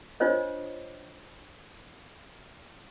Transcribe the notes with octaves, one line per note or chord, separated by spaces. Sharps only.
D4 F4 C5 C#5 D#5